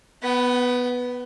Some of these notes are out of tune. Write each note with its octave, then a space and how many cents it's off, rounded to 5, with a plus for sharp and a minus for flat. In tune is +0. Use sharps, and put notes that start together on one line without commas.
B3 +0 F#5 +40